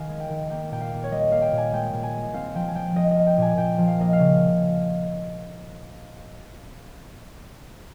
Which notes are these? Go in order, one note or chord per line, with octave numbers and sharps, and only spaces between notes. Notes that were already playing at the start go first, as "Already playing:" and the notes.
Already playing: D#3 F5 G#5
G#3
G5
D#3
A#3 G5
A#2 G5
F5
A#3
C#5
G3 D#5
A#3 F5
G5
A#2
G#5
G#3 G5
A#2
G#5
G#3
C4 F5
F3 G5
G#5
F3 G5
F3 D#5
D#5
A#3
G5
A#2 G#5
A#2 G5
F3
F5
A#3 D#5
F5
C#3